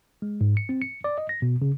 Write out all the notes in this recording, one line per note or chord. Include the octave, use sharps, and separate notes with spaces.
G#3
G#2
C#7
C4
C#7
D5
D#5
A#6
B2
C#3